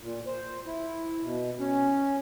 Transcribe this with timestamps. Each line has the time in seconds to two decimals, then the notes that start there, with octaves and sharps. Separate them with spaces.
0.01 A#2
0.26 C5
0.66 E4
1.24 B2
1.60 C#4